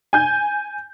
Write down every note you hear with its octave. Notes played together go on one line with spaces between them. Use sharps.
G#5 G6